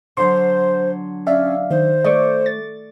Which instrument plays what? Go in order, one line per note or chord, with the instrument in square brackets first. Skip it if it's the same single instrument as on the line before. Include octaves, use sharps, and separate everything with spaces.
[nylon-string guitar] D3 F#3 [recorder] C5 [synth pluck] C6
[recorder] C#4 [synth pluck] D5 E5 F5
[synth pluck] D#3 [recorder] C5
[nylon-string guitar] A3 [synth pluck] D5 C#6 D6
[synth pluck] A6